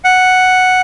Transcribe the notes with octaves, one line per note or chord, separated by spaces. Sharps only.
F#5